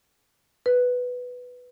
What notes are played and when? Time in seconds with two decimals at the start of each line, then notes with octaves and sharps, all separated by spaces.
0.66 B4